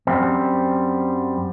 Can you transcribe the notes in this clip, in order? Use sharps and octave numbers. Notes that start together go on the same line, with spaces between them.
F#2 G3 C4